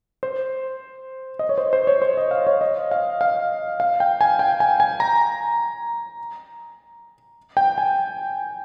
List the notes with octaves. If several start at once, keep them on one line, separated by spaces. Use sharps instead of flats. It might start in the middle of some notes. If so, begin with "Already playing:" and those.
C5
D#5
C#5
C5
C5
C#5
C5
D#5
F5
C#5
D#5
F5
F5
F5
G5
G#5
G5
G#5
G#5
A#5
G5
G#5